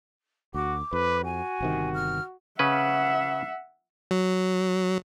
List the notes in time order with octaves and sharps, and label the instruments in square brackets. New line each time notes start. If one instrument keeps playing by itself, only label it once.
[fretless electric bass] D2 [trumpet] F#4 [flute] D6
[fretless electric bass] F2 [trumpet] B4
[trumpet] F#4 [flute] G#5
[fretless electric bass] G1 C3 D#3
[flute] F6
[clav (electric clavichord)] C#3 C#4 B4 [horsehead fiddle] E5 F#5
[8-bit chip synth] F#3